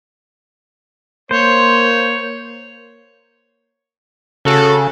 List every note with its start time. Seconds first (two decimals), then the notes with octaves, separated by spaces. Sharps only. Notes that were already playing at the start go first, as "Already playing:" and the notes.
1.31 A#3 C5 C#5
4.45 C#3 C#4 F#4 A4